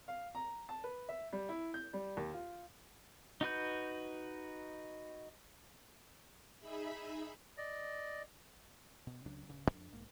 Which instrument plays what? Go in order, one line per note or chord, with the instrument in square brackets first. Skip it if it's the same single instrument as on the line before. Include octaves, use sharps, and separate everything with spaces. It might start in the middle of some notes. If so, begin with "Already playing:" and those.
[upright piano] F5
A#5
A5
B4
E5
G3
E4
G6
G3
D#2
F4
[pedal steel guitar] D#4 F#4 B4 G6
[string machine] D#4 G#4 E5 B5
[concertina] D5 D#5
[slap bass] B2
C#2 C#3 F#3 D4
D1 G2 C#3
F2 D4
B1 G#2 A#3